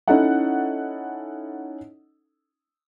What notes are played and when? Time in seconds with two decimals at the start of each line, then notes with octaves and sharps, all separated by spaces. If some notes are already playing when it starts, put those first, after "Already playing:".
0.08 C#4 D#4 E4 A4 D#5 F#5